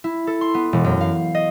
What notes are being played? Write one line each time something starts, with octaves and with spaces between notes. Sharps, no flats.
E4
A4
C6
B3
E1
F#2
F5
D#5